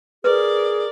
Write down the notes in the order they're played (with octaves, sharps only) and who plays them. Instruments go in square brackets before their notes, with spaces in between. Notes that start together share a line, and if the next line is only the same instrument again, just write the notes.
[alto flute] G#4 [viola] A#4 D5 [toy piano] B4